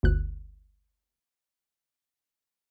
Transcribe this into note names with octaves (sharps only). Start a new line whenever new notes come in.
G1 D2 F#6